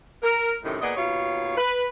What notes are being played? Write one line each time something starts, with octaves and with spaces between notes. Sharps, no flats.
A#4
F#2 A2 C3 D#3
A#2 B3 G#4 D5 D#5
D#2 B2 F4 C#5
B4